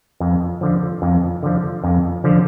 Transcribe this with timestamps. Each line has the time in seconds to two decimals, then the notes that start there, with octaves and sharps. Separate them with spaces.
0.20 F2
0.61 D3 F3
1.02 F2
1.43 D3 F3
1.84 F2
2.24 D3 F3